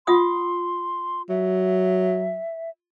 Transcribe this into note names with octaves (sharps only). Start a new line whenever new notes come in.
F4 F#5 C6 D#6
F#3 E5